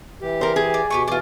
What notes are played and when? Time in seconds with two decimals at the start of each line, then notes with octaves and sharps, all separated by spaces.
0.22 E3 G4
0.41 A#4 C5
0.56 G#4
0.74 D5
0.90 B2 G4 B4 C#6
1.08 B2 E3 F4 D5